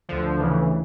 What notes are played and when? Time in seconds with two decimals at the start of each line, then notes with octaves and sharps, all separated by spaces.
0.09 D2 D3 F3
0.40 D2 C#3 E3